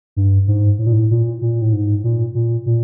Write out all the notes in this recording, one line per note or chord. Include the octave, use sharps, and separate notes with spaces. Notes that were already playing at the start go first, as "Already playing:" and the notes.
G2
G#2
A2
A#2
A2
A#2
A#2
A2
G#2
A#2
A#2
A#2